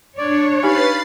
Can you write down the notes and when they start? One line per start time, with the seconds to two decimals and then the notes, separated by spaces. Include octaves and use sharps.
0.18 D4 C#5 D5
0.63 D#4 G4 B4 F5 G#5 B5 A6 C7